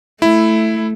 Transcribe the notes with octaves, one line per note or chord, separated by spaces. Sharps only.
A3 E4